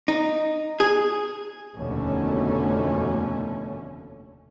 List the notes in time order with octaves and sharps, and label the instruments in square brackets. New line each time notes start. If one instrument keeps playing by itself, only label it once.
[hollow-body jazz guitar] D#4
G#4
[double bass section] F1 D#2 B2 D3 A3 C#4